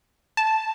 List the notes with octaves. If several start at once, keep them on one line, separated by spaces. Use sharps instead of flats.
A5